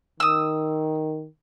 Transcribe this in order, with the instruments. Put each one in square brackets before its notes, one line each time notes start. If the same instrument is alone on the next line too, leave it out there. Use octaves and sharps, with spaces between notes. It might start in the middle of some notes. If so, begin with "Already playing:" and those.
[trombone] D#3 [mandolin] D#6 E6